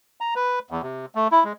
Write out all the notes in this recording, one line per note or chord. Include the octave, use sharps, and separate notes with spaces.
A#5
B4
E2
C3
A3
E4
G#3